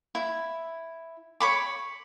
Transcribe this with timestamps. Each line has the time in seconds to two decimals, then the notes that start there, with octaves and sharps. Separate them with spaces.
0.15 E4
1.40 C#5 B5 D6